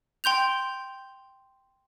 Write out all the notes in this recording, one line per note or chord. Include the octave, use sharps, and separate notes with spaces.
G5 C6 G6 F7